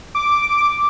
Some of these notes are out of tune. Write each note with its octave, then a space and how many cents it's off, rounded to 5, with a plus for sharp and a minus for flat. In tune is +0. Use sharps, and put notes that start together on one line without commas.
D6 +0